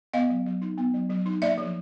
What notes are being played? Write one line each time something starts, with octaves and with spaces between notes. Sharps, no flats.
B3 D#5 F5
F#3
F#3
D#4
B3
F#3
F#3
D#4
A#3 D5 E5
F3